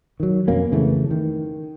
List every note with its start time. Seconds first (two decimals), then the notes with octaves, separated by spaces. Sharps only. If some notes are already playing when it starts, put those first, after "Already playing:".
0.20 D#3 F#3
0.48 F2 B2 A#3 C#4
0.71 F2 C#3 E3 A3
1.11 D#3